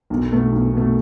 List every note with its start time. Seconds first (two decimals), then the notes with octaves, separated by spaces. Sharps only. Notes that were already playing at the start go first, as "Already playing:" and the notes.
0.10 B1
0.31 B2 A3
0.53 B1
0.73 B2 A3